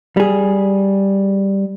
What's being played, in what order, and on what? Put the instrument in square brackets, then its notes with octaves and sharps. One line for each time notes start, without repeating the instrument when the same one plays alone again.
[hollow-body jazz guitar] G3 G#4